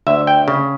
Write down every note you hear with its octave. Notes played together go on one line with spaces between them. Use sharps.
D2 E5
G5
C#3